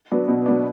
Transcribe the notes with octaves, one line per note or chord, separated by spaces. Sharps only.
F#3 B3 D4
B2
F#3 B3 D4